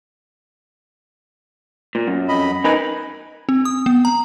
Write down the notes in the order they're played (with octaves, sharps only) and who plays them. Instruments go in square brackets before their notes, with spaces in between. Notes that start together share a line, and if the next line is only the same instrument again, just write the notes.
[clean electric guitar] A#2
F#2
[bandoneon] F2 D#5 B5
[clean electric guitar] D#4 A#4 B4 [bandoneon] G#5 B5
[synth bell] C4
D#6
B3
A#5